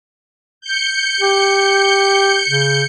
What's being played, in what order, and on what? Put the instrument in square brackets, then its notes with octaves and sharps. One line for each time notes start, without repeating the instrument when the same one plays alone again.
[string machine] G6 C#7
[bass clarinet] G4
C#3